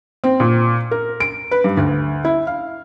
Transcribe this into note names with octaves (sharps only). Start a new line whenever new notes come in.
C4
A#2
A#4
D7
B4
G2
D2
E4
F5